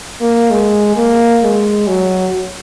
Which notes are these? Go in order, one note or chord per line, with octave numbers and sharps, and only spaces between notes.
A#3
G#3
A#3
G#3
F#3